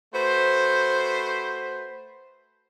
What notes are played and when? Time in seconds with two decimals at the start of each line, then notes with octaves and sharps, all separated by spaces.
0.14 A3 F#4 B4 C5